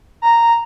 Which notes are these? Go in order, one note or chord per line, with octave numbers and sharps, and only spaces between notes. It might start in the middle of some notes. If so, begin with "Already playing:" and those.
A#5